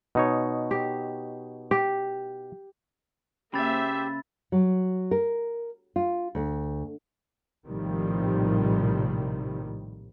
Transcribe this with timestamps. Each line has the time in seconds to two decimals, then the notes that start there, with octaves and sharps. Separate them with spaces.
0.15 B2 D#4 C#5
0.71 G4
1.71 G4
3.54 C#3 A#3 G4 C5 E5 B5 A6
4.52 F#3
5.11 A#4
5.96 F4
6.35 D2
7.67 A#1 A2 C3 D#3 F3 G3